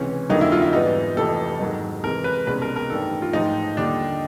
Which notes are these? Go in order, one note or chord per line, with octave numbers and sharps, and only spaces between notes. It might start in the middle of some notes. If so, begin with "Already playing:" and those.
Already playing: C#2 C3 E3 C#4
F2 D3 F#3 A#3 D#4
E4
F4
E4
G#2 E3 G3 B3 D#4
F1 F2 C3 E3 A4
G#2 D#3 F#3 A#3
C3 E3 G#3 A#4
B4
C2 B2 G#3 C#4 B4
A#4
A#4
A1 G2 D#3 A4
F4
A1 G#2 F3 D#4
D#2 D3 G3 D4